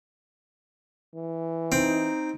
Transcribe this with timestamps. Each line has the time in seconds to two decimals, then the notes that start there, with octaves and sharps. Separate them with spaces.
1.15 E3
1.72 C4 D#4